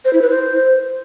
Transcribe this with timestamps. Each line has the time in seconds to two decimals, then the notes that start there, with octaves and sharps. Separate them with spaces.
0.05 C5
0.13 E4
0.22 B4
0.30 C5